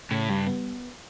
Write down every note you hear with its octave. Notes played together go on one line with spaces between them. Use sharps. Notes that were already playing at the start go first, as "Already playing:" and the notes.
A2 C#3
G2 G3
B3